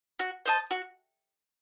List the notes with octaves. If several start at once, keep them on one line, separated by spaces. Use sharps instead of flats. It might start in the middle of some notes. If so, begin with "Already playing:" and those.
F#4
C5 D#5 A5
F#4